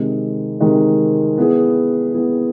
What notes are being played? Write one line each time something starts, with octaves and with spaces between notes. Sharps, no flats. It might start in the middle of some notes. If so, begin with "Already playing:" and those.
Already playing: C3 D#3 G#3
C3 D#3 G#3
B3 E4 G#4
B3 E4 G#4